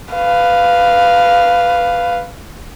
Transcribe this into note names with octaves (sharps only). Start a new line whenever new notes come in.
B4 F5